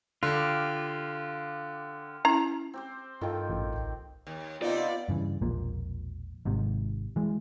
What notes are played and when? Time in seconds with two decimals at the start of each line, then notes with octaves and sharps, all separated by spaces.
0.23 D3 F4 G4
2.25 C#4 E4 A#5
2.74 C4 G4 C5
3.21 G2 D#3 F4 A4 G5
3.49 A1
3.74 C2
4.27 D#2
4.62 C3 B3 D#4 F4 D5
5.09 G2 C#3 E3
5.41 E1 A#1 F3 A#3
6.45 G#1 G#2 C3
7.16 E3 G#3